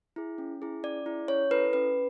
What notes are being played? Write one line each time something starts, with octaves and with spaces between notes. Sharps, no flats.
E4 G#4
C#4
E4 G#4
C#4 D5
E4 G#4
C#4 C#5
E4 A4 B4
C#4 B4